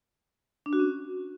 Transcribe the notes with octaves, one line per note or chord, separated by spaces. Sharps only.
D4
F#4
C#4